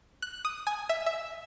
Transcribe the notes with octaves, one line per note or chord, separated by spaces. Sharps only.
F#6
D#6
G#5
E5
E5